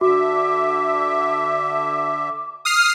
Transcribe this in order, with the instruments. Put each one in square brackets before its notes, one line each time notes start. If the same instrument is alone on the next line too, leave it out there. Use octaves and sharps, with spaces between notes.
[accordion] D3 E5 [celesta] F#4 [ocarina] D6
[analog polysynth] D#6 F6 C7